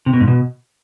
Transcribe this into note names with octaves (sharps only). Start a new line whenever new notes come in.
C3
B2
G#2
B2